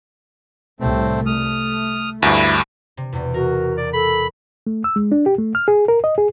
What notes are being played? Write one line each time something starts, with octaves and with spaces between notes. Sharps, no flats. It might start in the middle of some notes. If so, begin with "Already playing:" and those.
C2 A2 A3 C4
A3 D#6 F6
D2 G2 E4
C3
E2 B2
F#4 A#4
D5
A4 B5
A3
E6
G#3
D4
G4
A3
F6
G#4
A#4
D#5
G#4